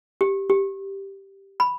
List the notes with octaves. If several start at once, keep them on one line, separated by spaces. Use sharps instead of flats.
G4
G4
B5